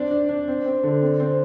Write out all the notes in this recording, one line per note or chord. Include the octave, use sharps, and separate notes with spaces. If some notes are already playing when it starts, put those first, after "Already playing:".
Already playing: C4 D4 D5
D4
D4
C4
C4
D3
C4
C4